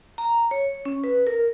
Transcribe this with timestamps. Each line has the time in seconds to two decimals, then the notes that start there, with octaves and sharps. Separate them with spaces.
0.18 A#5
0.51 C#5
0.85 C#4
1.04 B4
1.27 A#4